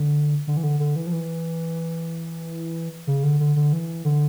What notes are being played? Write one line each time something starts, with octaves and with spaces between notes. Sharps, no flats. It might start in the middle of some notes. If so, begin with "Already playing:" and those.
Already playing: D3
D3
E3
D3
D3
E3
F3
E3
C#3
D3
D3
D3
E3
D3